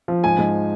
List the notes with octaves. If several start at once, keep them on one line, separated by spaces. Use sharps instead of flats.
F3
G#2 G#5
G#2